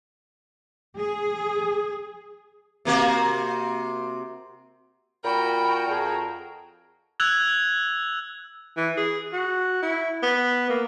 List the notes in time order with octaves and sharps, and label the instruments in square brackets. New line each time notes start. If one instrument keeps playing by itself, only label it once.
[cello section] G#4
[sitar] C3 A#3 F#4
[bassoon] A#2 [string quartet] F#4 G5 [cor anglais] A#4 [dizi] B5
[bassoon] F2 [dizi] G#4
[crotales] E6 F#6 G#6 F7 F#7
[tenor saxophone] E3
G#4
F#4
E4
B3
A#3